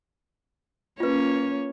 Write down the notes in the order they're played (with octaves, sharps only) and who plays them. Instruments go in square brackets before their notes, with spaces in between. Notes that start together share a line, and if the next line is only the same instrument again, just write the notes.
[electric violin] A#3 C#5 [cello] C#4 [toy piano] F4 B4